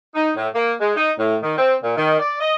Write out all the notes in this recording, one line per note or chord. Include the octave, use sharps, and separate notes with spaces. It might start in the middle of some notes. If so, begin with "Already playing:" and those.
D#4
A2
A#3
G#3
D#4
A2
D#3
C4
A#2
D#3
D5
D#5